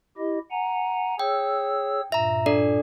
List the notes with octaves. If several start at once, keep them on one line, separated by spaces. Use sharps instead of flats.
E4 G4 D#5
F#5 G#5 A#5
G#4 C#5 G5 E6
G2 A#2 E5 A#5
D4 A4 D5